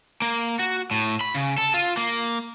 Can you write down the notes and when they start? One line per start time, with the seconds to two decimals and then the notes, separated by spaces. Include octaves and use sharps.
0.22 A#3
0.59 F#4
0.91 A2
1.21 B5
1.35 C#3
1.58 A4
1.74 F4
1.97 A#3